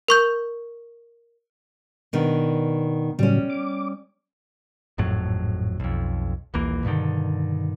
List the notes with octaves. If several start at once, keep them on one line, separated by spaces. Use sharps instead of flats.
A#4 C#6 G6
B2 D#3 D4
A2 C#3 F#3 G3 C#4
D6
G#1 F2 A2 F#3
B1 F2
D#1 A#1 E3 A#3
G2 B2 D3 D#3